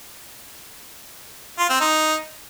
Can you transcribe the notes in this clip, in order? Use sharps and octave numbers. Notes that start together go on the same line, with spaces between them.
F4
C4
D#4